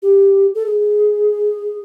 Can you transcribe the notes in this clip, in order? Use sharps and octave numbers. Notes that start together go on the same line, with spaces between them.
G4
A4
G#4